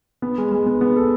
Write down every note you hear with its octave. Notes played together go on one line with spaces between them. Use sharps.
B3
G#3
G#3
B3
B3
A4